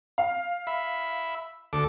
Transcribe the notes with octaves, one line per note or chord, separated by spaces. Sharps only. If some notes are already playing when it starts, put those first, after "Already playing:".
F5
E5 B5
D2 A4 D6